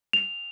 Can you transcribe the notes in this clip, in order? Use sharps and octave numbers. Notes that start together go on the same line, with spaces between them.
F7